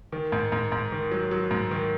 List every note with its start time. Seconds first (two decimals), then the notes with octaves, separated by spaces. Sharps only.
0.12 D#3
0.32 G#2
0.52 G#2
0.72 G#2
0.92 D#3
1.11 F#3
1.31 F#3
1.51 G#2
1.71 D#3